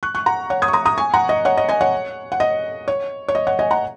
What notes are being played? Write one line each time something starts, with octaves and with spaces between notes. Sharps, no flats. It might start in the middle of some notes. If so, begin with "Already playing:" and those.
C#6 F#6
C#6 F#6
F#5 A#5
C#5 F#5
D#6 G#6
C#6
A#5 D#6
A#5 D#6
G#5 C#6
F#5 A#5
D#5
C#5 F#5
D#5
D#5 G#5
C#5 F#5
F#5
D#5
C#5
C#5
D#5
C#5 F#5
D#5 G#5
F#5 A#5